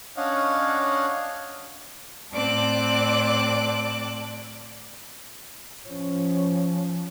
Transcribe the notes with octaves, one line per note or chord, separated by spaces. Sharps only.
C#4 D4 C#5 D#5 F5 F#5
A2 C4 D5 A5 D6 F#6
F3 C#4